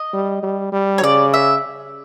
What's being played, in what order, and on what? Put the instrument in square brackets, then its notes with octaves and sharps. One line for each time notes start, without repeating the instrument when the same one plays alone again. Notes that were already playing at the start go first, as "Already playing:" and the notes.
Already playing: [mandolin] D#5
[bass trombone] G3
G3
G3
[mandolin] C#5
[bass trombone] C#3 [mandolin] D5
[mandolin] E5